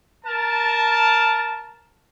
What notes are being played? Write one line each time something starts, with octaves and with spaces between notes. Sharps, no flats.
A#4 A5